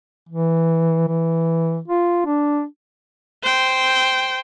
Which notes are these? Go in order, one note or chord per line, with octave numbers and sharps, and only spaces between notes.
E3
E3
F4
D4
C5 G5